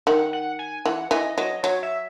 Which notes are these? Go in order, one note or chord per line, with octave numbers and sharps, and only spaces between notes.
D#3 F#5
F#5
G#5
E3 F#5
E3 D#5
F#3 D#5
F#3 C#5
E5